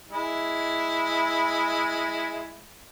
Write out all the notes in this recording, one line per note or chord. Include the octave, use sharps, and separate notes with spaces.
G#3 E4 E5